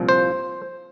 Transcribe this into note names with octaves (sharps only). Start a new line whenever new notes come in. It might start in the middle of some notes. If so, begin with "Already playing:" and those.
Already playing: C2 A#2 F3
C5